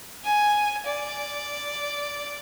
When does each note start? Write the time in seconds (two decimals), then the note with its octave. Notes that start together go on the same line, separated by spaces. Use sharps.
0.25 G#5
0.86 D5